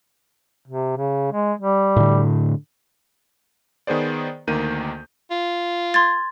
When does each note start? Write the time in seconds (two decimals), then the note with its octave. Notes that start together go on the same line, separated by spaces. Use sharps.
0.68 C3
0.97 C#3
1.32 G#3
1.59 G3
1.96 A2 D3
3.87 D#3 B3 G#4 C5 D5
4.47 D2 D#3 A#3 G6 D#7
5.31 F4
5.94 C6 G#6 A6